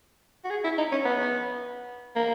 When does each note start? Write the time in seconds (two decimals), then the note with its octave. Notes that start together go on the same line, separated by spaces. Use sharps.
0.44 F#4
0.50 G#4
0.64 E4
0.78 D#4
0.92 C#4
1.05 B3
2.16 A#3